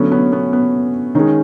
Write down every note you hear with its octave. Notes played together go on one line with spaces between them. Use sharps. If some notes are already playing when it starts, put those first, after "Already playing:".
Already playing: D3 F#3 A3 B3 C#4
B3 C#4
B3
B3
D#3 G#3 C#4 D#4